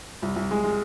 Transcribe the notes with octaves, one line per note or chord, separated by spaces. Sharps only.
C2
C2
G#3
G#3